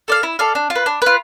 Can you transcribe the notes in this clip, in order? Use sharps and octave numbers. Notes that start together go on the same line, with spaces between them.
A4 D5 F5
E4
A4 D5 F5
D4
F4
B4
D4
F4 B4